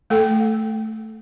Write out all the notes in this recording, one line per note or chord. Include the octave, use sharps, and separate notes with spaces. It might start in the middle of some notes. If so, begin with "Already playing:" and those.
A3 A4 G5